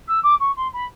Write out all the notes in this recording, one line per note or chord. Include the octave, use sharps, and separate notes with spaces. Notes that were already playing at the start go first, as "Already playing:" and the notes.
E6
D6
C#6
C6
B5